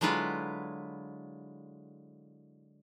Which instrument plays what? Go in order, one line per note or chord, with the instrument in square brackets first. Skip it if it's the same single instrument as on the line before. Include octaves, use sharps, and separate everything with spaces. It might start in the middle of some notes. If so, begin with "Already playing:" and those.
[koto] D3 F#3 G#3 E4 F4 B4